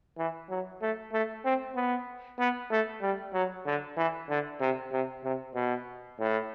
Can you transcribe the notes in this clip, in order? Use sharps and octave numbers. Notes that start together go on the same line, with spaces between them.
E3
F#3
A3
A3
C4
B3
B3
A3
G3
F#3
D3
E3
D3
C3
C3
C3
B2
A2